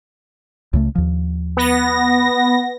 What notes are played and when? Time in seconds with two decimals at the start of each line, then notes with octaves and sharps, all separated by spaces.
0.73 C#2 C#3 A3
0.95 D#2 F3
1.57 B3 A#6